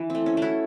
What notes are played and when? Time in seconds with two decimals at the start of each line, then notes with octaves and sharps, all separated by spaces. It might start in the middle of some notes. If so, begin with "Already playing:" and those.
Already playing: E3
0.10 A3 C4
0.26 C#4
0.37 A3 E4 F#4